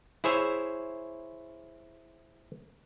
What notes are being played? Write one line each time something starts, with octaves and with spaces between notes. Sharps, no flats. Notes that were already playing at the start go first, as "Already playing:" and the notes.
E4 G#4 C5 C#5 E5